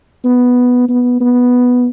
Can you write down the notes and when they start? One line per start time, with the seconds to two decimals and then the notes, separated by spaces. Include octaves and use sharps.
0.25 B3
0.89 B3
1.21 B3